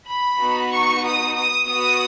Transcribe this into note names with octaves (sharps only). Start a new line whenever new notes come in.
B5
B3 D#4 F#4
C#6
D#6
D#6
B3 F#4 D#6